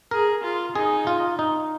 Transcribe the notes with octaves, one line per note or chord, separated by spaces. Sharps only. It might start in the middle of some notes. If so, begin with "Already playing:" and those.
G#4 A#4
F4
D#4 G#4
F4
D#4